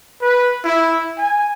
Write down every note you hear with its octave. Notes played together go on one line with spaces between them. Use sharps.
B4
E4
G#5